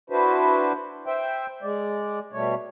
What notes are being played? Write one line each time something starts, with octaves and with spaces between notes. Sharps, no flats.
D4 E4 F#4 B4 C5
C5 E5 G5
G#3 D5
B2 G3 A3 C#5